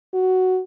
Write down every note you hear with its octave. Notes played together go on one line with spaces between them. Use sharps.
F#4